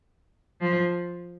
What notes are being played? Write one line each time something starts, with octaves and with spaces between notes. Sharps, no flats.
F3